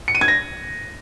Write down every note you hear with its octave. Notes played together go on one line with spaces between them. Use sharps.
C#7
D#7
G#6
A#6